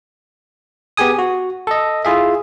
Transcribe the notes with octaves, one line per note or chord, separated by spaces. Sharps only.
B3 G4 G#4 G#5 D#6
F#4
A4 D#5
E4 F4 G#4 E5